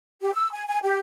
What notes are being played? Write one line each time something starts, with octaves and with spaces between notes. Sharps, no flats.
G4
E6
G#5
G#5
G4